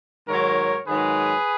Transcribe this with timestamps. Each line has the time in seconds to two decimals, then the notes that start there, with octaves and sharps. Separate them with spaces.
0.27 G#2 D#3 F#3 A#4 C#5
0.87 G#2 D#3 F#3 G#4 B4